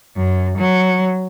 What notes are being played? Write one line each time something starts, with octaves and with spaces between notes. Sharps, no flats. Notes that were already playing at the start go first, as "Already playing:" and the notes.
F#2
F#3